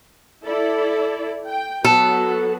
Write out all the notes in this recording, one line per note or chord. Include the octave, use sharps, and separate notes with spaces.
E4 A4 D5
G5
F#3 B3 F#4 A4